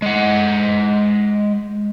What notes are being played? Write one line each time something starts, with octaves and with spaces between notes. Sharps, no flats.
G#3 F#5